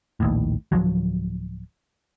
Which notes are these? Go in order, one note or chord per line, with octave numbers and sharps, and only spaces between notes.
A#1 D#2 A2
D1 C2 F3 F#3